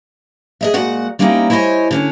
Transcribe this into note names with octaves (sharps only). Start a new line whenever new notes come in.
G#4 D#5 E5
A#2 G#3 F#4 F#5
G3 A#3 C4 C#4 D#4 E4
E4 C5 C#5 D#5 G#5
D3 C#4 C#5